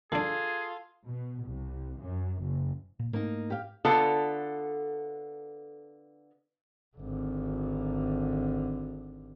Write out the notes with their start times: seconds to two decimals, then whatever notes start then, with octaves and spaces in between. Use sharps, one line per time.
0.12 D#3 D4 F4 G#4 A4
1.06 B2
1.42 C2
2.00 F#2
2.42 F#1
2.99 A#2
3.13 G#2 A3 A#3 D#4
3.50 G4 F5
3.85 D3 B3 F4 A4
6.97 G#1 D3